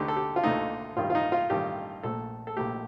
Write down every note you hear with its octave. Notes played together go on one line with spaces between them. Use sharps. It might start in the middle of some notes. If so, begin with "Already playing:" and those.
Already playing: D2 D3 A3 D#4 G4
A4
G4
F4
D2 D3 A3 D#4
A1 G2 D#3 G3 F4
F4
D#4
F4
A1 G2 D#3 G3 G4
A#1 A#2 A3 A4
A4
A#1 A#2 A3 G4